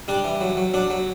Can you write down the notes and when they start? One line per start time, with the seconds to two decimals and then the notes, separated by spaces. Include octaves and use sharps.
0.08 G3 D4
0.24 E3
0.41 F#3
0.57 F#3
0.74 F#3 D4
0.90 F#3